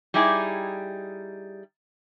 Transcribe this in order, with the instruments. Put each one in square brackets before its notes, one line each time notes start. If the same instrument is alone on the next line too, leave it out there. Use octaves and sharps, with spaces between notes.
[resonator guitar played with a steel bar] G3 D#4 E4 G4 G#4